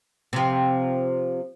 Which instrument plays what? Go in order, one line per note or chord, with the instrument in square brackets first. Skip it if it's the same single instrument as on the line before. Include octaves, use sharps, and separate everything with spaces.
[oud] C3 F3